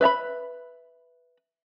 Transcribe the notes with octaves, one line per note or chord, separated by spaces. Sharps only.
B4 E5 A#5 B5